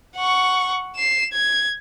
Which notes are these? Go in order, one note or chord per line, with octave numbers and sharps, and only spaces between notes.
F#5 C#6
C7 E7
G#6